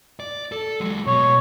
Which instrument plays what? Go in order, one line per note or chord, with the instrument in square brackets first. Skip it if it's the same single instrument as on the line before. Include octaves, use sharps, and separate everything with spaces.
[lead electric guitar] D5
A4
F#3 G#3
[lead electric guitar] B2 [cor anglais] C#5